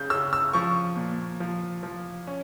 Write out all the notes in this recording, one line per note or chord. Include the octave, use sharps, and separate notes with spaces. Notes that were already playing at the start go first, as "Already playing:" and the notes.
Already playing: C#3 G6
C#3 E6
E6
F3 C#6
A#2
F3
F3
C#4